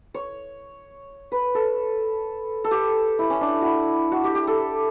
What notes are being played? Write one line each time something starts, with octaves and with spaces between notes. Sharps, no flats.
C#5
B4
A4
A4
G4
E4
C#4
D4
E4 F#4
F#4
G4
G4
A4